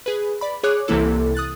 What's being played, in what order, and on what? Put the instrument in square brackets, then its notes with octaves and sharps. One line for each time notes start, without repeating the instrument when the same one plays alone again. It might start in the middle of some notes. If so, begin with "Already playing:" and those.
[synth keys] G#4 B4
D5 B5
G#4 C#5 D6 F#6
C2 C3 E3 A#3 E4 A4
D#6 F#6 A6